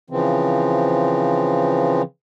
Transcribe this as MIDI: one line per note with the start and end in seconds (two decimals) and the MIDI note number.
0.10 2.02 49
0.10 2.02 52
0.10 2.02 53
0.10 2.02 60